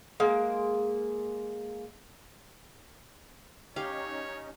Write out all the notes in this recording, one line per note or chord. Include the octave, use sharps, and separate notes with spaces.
G#3 A#3
C#4 D#4 G4 C#5 F5